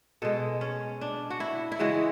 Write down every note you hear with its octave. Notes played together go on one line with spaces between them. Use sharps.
B2 G#3 A4
C#4
D4
F#4
E4
E4
C#3 E3 G#3 F#4